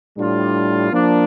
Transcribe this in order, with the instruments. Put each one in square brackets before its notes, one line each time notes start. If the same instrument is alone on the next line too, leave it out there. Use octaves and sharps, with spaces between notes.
[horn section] A2 G3 D4 F4
F3 A#3 D4